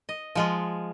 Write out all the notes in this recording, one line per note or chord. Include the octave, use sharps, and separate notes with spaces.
D#5
F3 G#3 F4